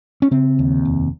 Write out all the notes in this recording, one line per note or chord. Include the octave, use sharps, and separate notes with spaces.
C#4
C#3 C4
D#2
F1